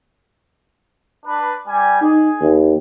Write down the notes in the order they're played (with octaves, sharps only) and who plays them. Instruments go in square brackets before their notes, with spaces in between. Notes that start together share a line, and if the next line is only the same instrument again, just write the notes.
[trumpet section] D4 B4
G3 G#5
[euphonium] D#4 [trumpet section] G#4
[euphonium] D#2